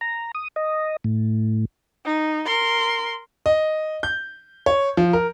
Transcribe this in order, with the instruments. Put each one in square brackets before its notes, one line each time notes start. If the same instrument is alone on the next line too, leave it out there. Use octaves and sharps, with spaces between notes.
[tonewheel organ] A#5
D#6
D#5
A2
[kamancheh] D#4
A#4 C6
[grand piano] D#5
G6
C#5
F3
A#4